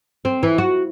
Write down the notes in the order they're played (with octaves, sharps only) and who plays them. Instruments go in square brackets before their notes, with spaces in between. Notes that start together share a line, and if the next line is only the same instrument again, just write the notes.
[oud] C4
E3
F#4